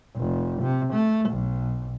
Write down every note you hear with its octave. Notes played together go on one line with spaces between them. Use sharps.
F1
C3
A3
B1